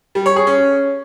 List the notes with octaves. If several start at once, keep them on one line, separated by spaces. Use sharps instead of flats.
G3
C#5
G#4
C#4